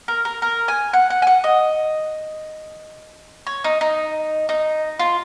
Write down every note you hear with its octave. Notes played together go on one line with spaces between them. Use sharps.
A#4
A#4
A#4
G#5
F#5
F#5
G#5
F#5
D#5
C#5
D#4
D#4
D#4
F4